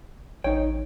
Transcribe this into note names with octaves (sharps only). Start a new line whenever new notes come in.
A1 D#4 C#5 G5